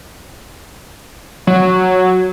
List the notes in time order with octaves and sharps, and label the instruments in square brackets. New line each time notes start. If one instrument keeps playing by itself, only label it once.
[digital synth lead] F#3